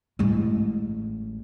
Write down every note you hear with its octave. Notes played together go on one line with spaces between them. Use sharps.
A1 G#3